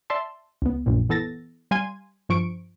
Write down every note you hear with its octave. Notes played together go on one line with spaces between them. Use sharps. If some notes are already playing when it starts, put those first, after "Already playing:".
D5 E5 A5 C6
C#2 B3
A#1 F#2 A#2
E3 B3 A4 A6 A#6
G3 F5 G#5 C6 G#6 D#7
G2 F3 C#6 D7